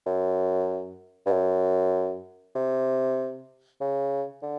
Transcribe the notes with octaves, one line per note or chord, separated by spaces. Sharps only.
F#2
G2
F#2
C3
C#3
D3